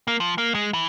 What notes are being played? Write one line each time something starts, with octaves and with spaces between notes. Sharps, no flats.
A#3
F3
A#3
G#3
E3